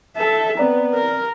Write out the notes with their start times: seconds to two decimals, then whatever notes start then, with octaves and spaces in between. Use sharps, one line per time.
0.16 A4 E5
0.57 B3 C4 D5 A#5
0.94 A#4